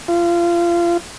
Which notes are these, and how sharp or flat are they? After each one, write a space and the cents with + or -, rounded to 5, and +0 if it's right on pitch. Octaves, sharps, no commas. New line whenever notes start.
F4 -25